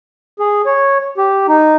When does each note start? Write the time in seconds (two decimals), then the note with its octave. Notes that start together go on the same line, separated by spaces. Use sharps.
0.39 G#4
0.66 C#5
1.18 G4
1.48 D#4